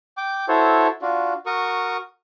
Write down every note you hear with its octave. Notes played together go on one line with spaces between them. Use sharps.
G5 D6
E4 F#4 A4 C5 C#5
D4 F4 F#4
F#4 A#4 C#6 D#6